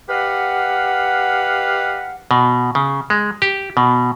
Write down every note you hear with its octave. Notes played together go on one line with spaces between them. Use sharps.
G4 B4 D#5 F5 F#5
B2
C#3
G#3
G4
B2